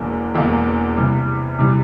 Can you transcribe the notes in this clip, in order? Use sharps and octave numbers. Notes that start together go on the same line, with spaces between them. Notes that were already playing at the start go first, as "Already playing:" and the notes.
Already playing: E1 E2 E3 A#3
E1 E2 E3 A#3
C3 E3 G3
C3 E3 G3